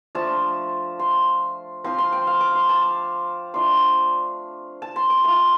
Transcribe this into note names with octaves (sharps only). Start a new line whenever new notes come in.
F3 A3 D4 F4 A5
C6
F3 C4 F4 C6
C6
G5
F5
D6
C6
A5
A3 D4 F4 C6
A5
C6
D6
A3 F4 C6